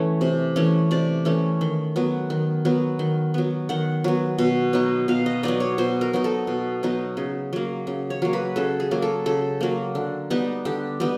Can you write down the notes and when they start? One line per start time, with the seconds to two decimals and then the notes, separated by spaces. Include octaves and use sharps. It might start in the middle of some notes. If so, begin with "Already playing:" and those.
Already playing: E3 A3 C#4 C#5
0.21 C3
0.56 E3 A3 C#4
0.91 C3 D5
1.25 E3 A3 C#4
1.61 D#3
1.96 F#3 B3
2.30 D#3
2.65 F#3 B3
2.99 D#3
3.34 F#3 B3
3.69 D#3 F#5
4.04 F#3 B3
4.38 B2
4.73 F#3 B3 D#4
5.08 B2 F5
5.26 D#5
5.43 F#3 B3 D#4 D5
5.60 C#5
5.78 B2 C5
6.01 A#4
6.13 F#3 B3 D#4
6.24 A4
6.47 B2
6.83 F#3 B3 D#4
7.17 C#3
7.53 F#3 A#3
7.87 C#3
8.10 C#5
8.22 F#3 A#3
8.33 B4
8.56 C#3 A4
8.80 G#4
8.91 F#3 A#3
9.02 A4
9.26 C#3 A4
9.61 F#3 A#3
9.95 D3
10.30 G3 B3 D#4
10.65 D3 G4
11.00 G3 B3 D#4